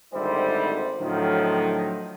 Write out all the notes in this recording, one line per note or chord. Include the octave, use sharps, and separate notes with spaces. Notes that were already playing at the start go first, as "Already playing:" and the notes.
G#1 D2 G3 E4 C5
A2 D3 D#3 F3 F#3